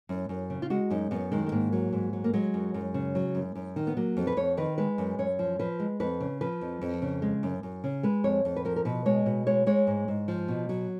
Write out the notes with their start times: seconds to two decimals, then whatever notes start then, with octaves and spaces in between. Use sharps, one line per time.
0.09 F#2
0.29 F#2
0.50 C#3
0.62 F4
0.70 G#3 F#4
0.90 F#2 D#4
1.11 F#2 B3
1.32 D#3 G#3
1.46 G#3
1.52 G#2 A#3
1.72 F#3
1.93 G#2
2.13 F#3
2.24 A#3
2.33 F#3 G#3
2.54 F#2
2.74 F#2
2.94 C#3
3.15 F#3
3.35 F#2
3.55 F#2
3.76 D#3
3.87 B3
3.97 F#3 A#3
4.17 F2
4.27 B4
4.37 F2 C#5
4.57 D#3 B4
4.78 G#3 B4
4.98 F#2
5.19 F#2 C#5
5.39 F3
5.59 F3 B4
5.80 G#3
6.00 F2 B4
6.20 C#3
6.41 F3 B4
6.61 F2
6.82 F2
7.02 C#3
7.22 G#3
7.43 F#2
7.63 F#2
7.84 C#3
8.03 G#3 B4
8.24 F2 C#5
8.45 F2
8.56 B4
8.65 F3 A#4
8.76 A#4
8.85 B2 B4
9.06 G#3 C#5
9.26 B2
9.46 G#3 C#5
9.66 G#3 C#5
9.87 G#2
10.08 G#2
10.28 F3
10.48 B2
10.69 F#3